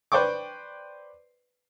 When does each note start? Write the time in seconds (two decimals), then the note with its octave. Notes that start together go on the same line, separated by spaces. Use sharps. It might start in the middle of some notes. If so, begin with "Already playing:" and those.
0.12 B4 C5 D5 G5 C#6 D6